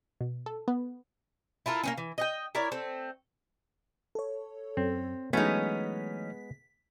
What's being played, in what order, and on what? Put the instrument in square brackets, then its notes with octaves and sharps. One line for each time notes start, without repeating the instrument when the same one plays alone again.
[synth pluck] B2
A4
B3
[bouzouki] E4 F4 A4 A#4
A#3 C4 C#4
E3
D#5 F#5 G5
E4 A#4 C#5 D5
A3 C4
[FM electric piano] A4 C#5
[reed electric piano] F#2 [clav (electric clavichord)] C4
[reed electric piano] E3 F#3 A3 [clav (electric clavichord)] G#3 B3 [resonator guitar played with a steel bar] C#4 D#4 [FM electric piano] B6